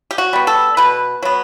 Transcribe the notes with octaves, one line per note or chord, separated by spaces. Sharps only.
G4
F#4
G3 B3
A4
B2 B4
F#3 B3